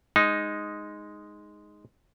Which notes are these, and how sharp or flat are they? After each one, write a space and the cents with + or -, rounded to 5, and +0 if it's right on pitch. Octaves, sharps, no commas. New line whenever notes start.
G#3 +0 D#4 +0